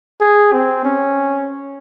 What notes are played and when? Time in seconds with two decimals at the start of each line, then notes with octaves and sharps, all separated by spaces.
0.21 G#4
0.53 C4
0.85 C#4